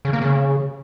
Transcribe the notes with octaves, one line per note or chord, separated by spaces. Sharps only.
C#3
A#3
C#3